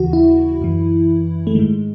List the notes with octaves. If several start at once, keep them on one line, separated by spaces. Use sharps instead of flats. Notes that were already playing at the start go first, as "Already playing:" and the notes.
Already playing: D#2 C#3 E3 F#4
E4
F#2 E3
A3
G#2 D#3 G#3